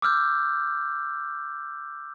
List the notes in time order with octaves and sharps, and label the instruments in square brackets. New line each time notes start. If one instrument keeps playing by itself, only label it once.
[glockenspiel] D6 E6 F6 G6